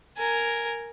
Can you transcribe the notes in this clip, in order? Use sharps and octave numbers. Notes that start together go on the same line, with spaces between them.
A#4 G#5